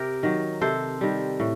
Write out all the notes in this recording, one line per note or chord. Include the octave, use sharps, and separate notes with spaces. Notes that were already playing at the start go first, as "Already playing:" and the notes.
Already playing: C3 G4 A#4
D#3 F#3
C3 A4 C5
D#3 G3
A2